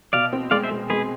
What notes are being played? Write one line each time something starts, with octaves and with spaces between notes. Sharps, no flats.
B2 D5 F5
C4
G#3 D5 F5
C5 E5
G#3
G#3 G#4 B4